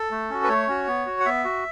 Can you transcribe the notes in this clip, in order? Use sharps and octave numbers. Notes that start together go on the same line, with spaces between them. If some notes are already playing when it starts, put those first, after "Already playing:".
Already playing: A4
A3
C#4 F#4
B4
A3 C#5
C#4 F#4
B3
F#4
F#5
B3 E5
F#4